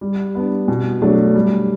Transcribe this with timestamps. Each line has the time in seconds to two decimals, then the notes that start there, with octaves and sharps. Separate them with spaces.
0.01 G3
0.35 B3 D4
0.68 B2
1.02 F#3 A3 D4
1.35 G3